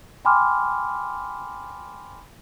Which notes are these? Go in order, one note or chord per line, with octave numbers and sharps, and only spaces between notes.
G5 G#5 B5 C6 D6 F6